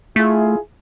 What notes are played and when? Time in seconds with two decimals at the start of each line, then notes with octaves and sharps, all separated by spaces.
0.16 A3 E4 F4 G#4